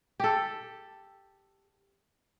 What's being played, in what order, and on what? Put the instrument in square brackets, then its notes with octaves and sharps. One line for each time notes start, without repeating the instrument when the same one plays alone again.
[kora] G4 A4